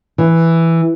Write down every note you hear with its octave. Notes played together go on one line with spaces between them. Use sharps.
E3